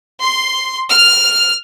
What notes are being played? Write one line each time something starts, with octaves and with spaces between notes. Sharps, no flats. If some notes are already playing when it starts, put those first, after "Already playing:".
C6
F6